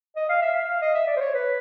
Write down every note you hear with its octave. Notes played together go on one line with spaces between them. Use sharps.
D#5
F5
E5
F5
F5
D#5
E5
D5
C5
C#5
B4